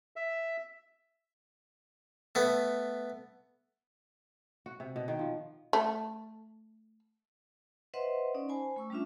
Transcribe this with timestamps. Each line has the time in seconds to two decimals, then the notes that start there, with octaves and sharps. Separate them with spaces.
0.16 E5
2.35 A3 B3
4.66 F#4
4.80 C3
4.96 B2
5.08 D#3
5.19 F3
5.73 A3
7.94 B4 C5 D#5 E5 F#5 C6
8.34 C#4 D#4 D5
8.49 C5 G#5 A5 B5
8.76 A3 C#6 E6
8.90 G3 C#4 D4 F4 E5